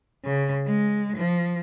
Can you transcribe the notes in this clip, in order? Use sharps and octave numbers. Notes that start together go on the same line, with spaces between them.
C#3
G#3
F3